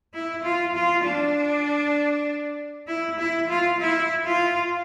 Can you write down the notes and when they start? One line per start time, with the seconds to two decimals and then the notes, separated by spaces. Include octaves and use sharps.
0.14 E4
0.43 F4
0.74 F4
1.04 D4
2.87 E4
3.18 E4
3.49 F4
3.80 E4
4.25 F4